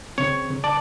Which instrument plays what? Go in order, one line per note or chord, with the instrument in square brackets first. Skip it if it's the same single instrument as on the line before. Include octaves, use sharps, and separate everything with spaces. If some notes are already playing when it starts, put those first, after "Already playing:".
[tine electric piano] C#3 C4 [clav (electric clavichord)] C#5
[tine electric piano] C#3
[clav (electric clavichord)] D5 [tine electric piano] A5